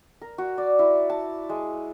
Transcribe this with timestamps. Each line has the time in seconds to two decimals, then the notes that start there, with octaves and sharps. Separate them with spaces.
0.22 A#4
0.38 F#4
0.58 D5
0.79 E4
1.10 A5
1.49 G#3